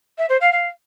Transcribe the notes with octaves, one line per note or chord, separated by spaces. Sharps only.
E5
C5
F5
F5